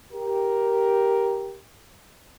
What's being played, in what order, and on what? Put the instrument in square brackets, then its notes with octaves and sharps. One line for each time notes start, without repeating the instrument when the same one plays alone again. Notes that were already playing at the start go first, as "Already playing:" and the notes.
[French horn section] G4 A#4